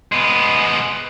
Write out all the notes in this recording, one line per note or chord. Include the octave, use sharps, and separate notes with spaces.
G#3 B3